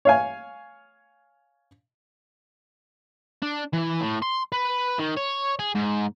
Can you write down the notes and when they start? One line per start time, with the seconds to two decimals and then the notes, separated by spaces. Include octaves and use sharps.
0.05 C#5 F5 G#5
3.43 D4
3.74 E3
4.01 A2
4.22 C6
4.52 B4
4.99 D#3
5.17 C#5
5.59 G#4
5.75 G#2